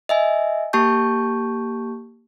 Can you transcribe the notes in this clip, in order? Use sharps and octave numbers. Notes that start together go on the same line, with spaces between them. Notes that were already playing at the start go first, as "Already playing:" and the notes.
D#5 E5 G#5
A#3 G4 A5 C#6 G6